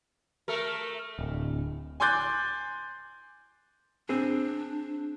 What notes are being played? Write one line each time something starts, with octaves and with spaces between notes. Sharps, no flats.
A3 A4 A#4
D1
G#5 C6 D6 F#6 G6 A6
C4 D4 G#4